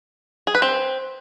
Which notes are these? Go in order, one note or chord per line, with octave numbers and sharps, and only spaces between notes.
G#4
B4
C4